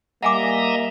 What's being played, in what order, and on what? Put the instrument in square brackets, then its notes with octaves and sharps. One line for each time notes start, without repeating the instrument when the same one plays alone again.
[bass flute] G3 [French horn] A#3 [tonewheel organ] D#5 E5 A#5 [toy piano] F#5 G#5 D6